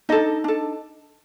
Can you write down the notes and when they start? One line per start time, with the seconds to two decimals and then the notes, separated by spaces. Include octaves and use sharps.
0.09 D4 D#4 A4 D#5
0.44 D4 A4